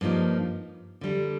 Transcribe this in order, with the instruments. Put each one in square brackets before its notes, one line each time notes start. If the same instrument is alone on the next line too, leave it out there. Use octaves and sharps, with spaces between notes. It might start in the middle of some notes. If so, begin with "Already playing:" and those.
[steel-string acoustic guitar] G2 F3 A#3 D#4
D3 G3 D4